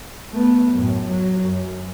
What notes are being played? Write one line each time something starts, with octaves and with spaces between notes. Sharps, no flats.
A3 B3
F#2 A2
F#3
F#2